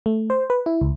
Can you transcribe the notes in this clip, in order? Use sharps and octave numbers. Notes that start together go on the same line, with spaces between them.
A3
C5
B4
E4
C#2